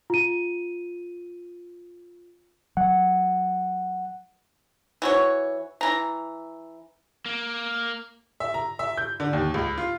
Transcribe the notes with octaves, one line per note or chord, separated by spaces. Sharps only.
F4 D#7
F#3 F#5
E3 F#4 C#5
E3 A#5
A#3
E5
A#5
E5
G6
D3
D#2
C#2
F4